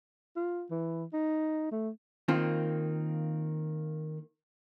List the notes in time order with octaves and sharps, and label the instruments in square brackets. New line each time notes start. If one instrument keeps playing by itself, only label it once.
[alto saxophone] F4
E3
D#4
A3
[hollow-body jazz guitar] D#3 A#3 C4 F4